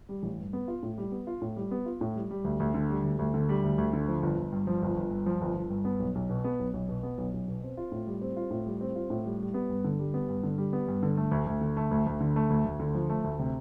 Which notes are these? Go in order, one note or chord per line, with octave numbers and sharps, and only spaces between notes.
G3
A1
G2
B3
F4
A2
G3
B3
F4
A2
G3
B3
F4
A2
G3
G3
D2
D2
D3
G3
D2
D2
D3
G3
D2
D2
D3
F3
G1
G1
G2
F3
G1
G1
G2
F3
G1
G1
G2
B3
B1
B1
B2
B3
B1
B1
B2
B3
B1
B1
B2
C4
F4
A2
G3
C4
F4
A2
G3
C4
F4
A2
G3
G3
B3
G2
D3
G3
B3
G2
D3
G3
B3
G2
D3
A3
D2
D2
D3
A3
D2
D2
D3
A3
D2
D2
D3
F3
A3
D2
C3